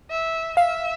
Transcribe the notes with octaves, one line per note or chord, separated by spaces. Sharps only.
E5
E5 F5